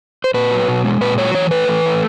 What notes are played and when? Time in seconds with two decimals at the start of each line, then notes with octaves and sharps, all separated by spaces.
0.24 C5
0.34 A#2 B4
0.51 F#3
0.68 B2
0.84 G#3
1.01 A#2 B4
1.18 F#3 C#5
1.34 E3 C#5
1.51 A3 B4
1.68 E3
1.85 A3